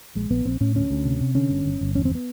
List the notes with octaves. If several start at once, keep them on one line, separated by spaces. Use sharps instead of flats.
A#1 G#3
A#1 B3
A#1 C4
A2 C#4
D2 C#4
D2
C3
C3
D3 C#4
G1
G1
G1
E2 C#4
C4
B3